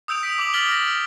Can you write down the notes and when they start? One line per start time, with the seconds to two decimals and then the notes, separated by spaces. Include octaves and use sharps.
0.08 D#6 E6 G6 D7 F7
0.23 B6 D7
0.38 D6 D#6 F#7
0.54 F6 A6 B6 F#7 G7
0.69 F6 A#6
0.88 F6